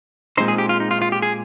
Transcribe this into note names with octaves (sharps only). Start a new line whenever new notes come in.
A#2 G#3 C4 D#4 C5
G#4
G4
F4
D#4
F4
F4
G4
G#4